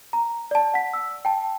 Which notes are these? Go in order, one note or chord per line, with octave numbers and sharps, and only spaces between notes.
A#5
D5 A5
F#5 B6
E6
G5 A5